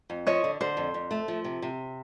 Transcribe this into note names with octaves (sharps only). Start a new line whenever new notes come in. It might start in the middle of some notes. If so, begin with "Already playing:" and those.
F2
F3 C#5 D#5
D3
D3 C5
F2
F2
A3
F3
C3
C3